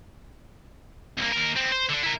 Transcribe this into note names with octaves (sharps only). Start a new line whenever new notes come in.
C2 A#3
D#2 A#4
B3 C4
C5
D3 D4
E4 A#4